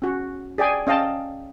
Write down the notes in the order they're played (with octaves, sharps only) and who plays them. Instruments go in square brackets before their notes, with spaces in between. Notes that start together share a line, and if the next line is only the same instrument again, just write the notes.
[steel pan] C#4 F#4
G#4 D5 G5 G#5
C#4 D#5 F5 G5 A5